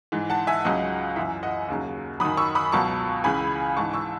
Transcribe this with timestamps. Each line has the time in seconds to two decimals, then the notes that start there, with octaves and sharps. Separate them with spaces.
0.12 G#2 E3
0.30 F#5 A5
0.47 E5 G#5
0.65 C#2 C#3 F#3 D#5 F#5
1.16 F#2 E3 E5
1.43 D#5 F#5
1.69 D#2 C#3 F#3
2.20 F#2 D#3 F#3 B5 D#6
2.37 C#6 E6
2.55 B5 D#6
2.72 C#2 B2 F#3 A5 C#6
3.24 C#2 C#3 E3 G#5 B5
3.77 G#2 E3 A5 C#6
3.93 C#6 E6